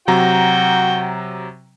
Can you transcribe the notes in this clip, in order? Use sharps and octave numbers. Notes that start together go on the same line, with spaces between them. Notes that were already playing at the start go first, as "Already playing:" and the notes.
C3 F#3 F#4 G5 A#5